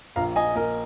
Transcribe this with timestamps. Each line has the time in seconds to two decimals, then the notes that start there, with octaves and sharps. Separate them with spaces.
0.16 A#1 F5 A#5
0.36 D#5 G#5
0.55 A#3 A#4 D#5